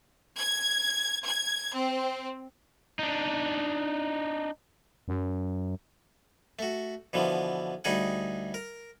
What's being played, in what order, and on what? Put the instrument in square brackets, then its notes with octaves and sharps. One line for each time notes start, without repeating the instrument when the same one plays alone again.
[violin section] G#6
G#6
C4
[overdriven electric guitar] D4 D#4
[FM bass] F#2
[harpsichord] A3 F#4
B2 D3 E3 F3
D2 G3 D#4 G#4 F#5
A#4